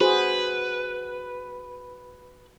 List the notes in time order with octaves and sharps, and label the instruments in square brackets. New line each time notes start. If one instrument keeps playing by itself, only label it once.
[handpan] F#4 G#4 C5 [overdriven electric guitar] B4